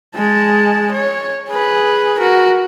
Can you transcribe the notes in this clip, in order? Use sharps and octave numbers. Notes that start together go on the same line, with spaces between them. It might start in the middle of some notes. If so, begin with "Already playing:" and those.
G#3 A5
C#5
G#4 B4
F#4 A#4